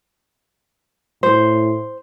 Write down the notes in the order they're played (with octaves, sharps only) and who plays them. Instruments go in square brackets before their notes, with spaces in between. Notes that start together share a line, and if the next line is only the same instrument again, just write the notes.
[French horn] A2 [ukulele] C5